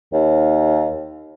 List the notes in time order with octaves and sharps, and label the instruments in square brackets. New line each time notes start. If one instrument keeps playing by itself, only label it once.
[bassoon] D#2